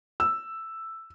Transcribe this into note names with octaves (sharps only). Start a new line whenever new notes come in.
E6